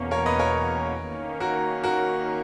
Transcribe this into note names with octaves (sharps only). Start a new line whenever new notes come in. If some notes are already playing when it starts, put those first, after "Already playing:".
Already playing: E2 B2 A#3 C#4
A#4 C#5
B4 D#5
A#4 C#5
D#3 A#3 C#4
F#4 A#4
F#4 A#4